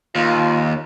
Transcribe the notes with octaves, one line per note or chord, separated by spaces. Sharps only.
D#2 F4